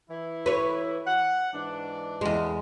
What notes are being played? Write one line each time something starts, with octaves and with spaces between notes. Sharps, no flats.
E3 E4
B4 C#5
F#5
G#2 E3 D4
E2 G#3